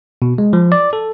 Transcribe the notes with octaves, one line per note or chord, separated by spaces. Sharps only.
B2
G#3
F3
D5
A4